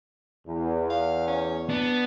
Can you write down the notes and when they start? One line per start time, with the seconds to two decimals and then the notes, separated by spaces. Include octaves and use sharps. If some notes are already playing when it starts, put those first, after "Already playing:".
0.46 E2
0.90 F5
1.27 C#4
1.70 B3 D4